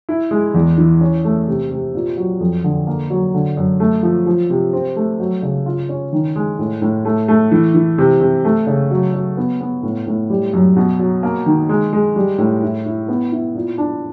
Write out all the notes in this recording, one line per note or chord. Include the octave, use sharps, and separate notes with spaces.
E4
G#3
E2
E3
C#4
A3
C3
C3
A#2
F#3
F2
D3
A#3
F#3
D3
F#2
A3
F3
F3
C3
C4
A3
F#3
C#3
F4
C#4
D#3
G#3
A2
A2
A3
A3
E3
E3
C3
C3
A3
C#3
F#3
F#3
B3
B3
A2
A2
G3
F#2
B2
F#3
A#3
D#3
G#3
G#3
G3
A2
E4
E4
B3
E4
A#2
D4